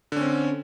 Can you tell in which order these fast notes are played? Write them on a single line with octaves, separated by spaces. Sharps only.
D3 C#4 C4